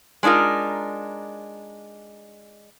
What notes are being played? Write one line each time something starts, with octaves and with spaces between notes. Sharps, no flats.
G#3 D4 D#4 F4 A#4